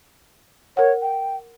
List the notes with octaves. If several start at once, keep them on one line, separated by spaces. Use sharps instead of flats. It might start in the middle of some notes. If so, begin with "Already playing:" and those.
A#4 C#5 F#5
G5